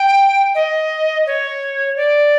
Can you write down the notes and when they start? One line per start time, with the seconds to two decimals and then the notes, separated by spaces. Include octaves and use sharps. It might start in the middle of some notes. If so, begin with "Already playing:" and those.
Already playing: G5
0.55 D#5
1.26 C#5
1.96 D5